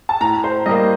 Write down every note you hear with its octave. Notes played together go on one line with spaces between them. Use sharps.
A5
A2 A#5
C5
G3 A#3 D#5